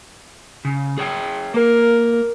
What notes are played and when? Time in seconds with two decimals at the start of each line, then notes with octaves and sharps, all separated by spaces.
0.65 C#3
0.98 G#4 C#5 G5
1.54 A#3 A#4